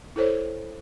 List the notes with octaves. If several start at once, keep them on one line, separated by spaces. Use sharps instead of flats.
E4 A4 C5 C#5